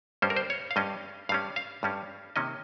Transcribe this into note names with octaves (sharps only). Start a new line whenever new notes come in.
G2 G3 C#4 C5
A#4
C5
C#5
F5
G2 G3 C#4 D#5
G2 G3 C#4 F5
F5
G2 G3 C#4
C3 D#3 A#3 C#4 D#5